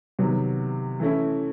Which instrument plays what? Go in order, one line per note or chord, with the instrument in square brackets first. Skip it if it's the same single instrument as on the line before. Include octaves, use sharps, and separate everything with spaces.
[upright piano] C3 D#3 F#3 B3
E3 A3 C#4 E4